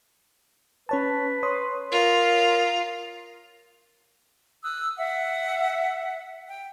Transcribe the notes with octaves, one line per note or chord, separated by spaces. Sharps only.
C#4 B4 C#5 A5
C#5 C6 D#6
F4 A#4
D#6 E6 F#6
E5 F#5
G5